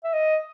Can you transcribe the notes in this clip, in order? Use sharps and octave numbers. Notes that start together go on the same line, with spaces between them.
E5
D#5